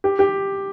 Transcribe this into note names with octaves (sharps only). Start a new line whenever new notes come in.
G4
G4